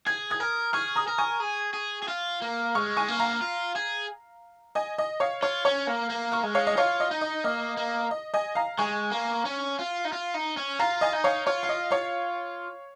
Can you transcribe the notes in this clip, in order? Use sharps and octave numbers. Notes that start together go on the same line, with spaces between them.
G#4 G#6
D#6 G#6
A#4
G#4 C#6 F6
A#5 D#6
A#4
G#5 C#6
G#4
G#4
G#4
F4
A#3
G#3 C#6 F6
G#5 C#6
A#3
F5 A#5
F4
G#4
D#5 G#5
D#5
C#5 F5
F4 C#5
C#4 C#5
A#3
A#3
C#6 F6
G#3
C#5 F5
D#5
F4 C#5 F5
D#5
D#4
D#5
A#3 D#5
A#3
D#5
D#5 G#5
F5 A#5
G#3 G#5 C#6
A#3
C#4
F4
D#4
F4
D#4
C#4
F4 F5 A#5
D#5 G#5
D#4
C#5 F5
F4 C#5
F5
D#5
C#5 F5